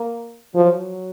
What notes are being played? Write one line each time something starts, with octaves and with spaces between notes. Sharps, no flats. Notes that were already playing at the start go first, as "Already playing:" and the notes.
Already playing: A#3
F3 F#3